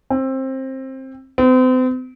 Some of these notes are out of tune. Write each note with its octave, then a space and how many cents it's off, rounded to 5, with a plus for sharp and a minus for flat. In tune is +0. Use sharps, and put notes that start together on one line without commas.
C4 +20
C4 -40